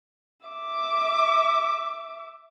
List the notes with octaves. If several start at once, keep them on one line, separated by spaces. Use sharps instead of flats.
E5 D6